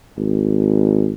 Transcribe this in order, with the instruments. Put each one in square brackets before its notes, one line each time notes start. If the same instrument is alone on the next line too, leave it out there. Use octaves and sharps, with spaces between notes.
[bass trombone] G#1